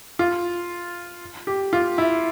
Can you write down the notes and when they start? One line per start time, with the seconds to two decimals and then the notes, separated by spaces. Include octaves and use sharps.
0.19 F4
1.47 G4
1.73 F4
1.98 E4